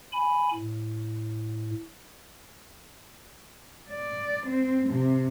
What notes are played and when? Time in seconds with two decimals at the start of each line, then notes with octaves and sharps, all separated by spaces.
0.12 G#5 B5
0.53 A2
3.90 D5
4.47 C4
4.89 C3